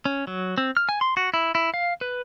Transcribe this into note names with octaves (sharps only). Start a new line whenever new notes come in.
C#4
F#3
C4
F6
G#5
C6
F#4
E4
E4
F5
B4